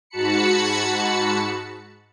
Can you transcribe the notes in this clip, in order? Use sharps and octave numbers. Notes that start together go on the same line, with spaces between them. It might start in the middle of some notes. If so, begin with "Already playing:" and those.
G#2 F#4 A5 B5 C#7